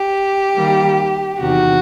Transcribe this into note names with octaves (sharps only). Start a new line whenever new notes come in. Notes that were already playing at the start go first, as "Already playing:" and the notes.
Already playing: G4
D#3 G3 A#3
E2 C3 D#3 F#4